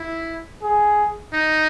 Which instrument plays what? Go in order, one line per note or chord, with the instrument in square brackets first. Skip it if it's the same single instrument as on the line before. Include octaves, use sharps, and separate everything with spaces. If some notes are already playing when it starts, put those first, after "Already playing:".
Already playing: [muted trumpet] E4
[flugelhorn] G#4
[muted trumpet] D#4